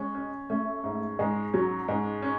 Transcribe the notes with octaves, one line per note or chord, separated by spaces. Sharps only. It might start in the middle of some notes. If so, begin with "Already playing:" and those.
Already playing: G#3 C#4
C#4
A3 C#4
G#2
G#2 G#3
F#3 C#4
G#2 G#3
C#4